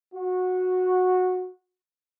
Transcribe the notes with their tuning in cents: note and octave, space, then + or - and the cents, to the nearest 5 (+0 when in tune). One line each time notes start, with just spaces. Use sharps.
F#4 -15